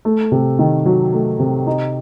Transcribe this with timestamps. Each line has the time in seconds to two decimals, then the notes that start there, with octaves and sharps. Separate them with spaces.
0.05 A3
0.32 C3
0.59 D#3
0.86 F#3
1.13 A3
1.39 C3
1.67 D#4